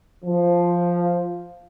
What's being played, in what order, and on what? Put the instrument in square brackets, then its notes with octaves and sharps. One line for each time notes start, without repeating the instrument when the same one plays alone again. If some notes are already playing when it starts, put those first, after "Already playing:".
[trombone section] F3